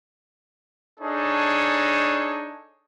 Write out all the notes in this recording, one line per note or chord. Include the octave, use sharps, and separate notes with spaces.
D4 D#4 G#4 A4 C#5